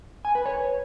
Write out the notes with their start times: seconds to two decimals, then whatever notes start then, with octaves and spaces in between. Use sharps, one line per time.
0.25 G#5
0.35 B4
0.46 C#5